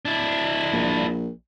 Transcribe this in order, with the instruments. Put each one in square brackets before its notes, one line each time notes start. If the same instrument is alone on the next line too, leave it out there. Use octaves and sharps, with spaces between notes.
[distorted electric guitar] D4 E4
[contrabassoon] A#1